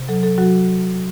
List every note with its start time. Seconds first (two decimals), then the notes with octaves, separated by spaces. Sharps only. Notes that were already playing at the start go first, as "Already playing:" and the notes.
Already playing: C3
0.09 F#3 A4
0.23 A4
0.38 F#3 F#4